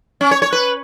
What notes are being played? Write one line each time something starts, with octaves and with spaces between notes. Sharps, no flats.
C#4
C#5
C#5
B4